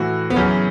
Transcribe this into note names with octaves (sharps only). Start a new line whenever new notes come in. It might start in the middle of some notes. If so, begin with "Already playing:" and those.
Already playing: A2 E3 F#4
B3
F#2 C#3 E3 C#4